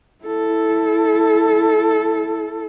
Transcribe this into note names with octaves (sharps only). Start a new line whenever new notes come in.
E4 A4